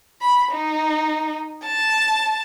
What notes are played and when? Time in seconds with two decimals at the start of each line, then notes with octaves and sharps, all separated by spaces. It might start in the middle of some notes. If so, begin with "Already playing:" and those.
0.22 B5
0.52 D#4
1.65 A5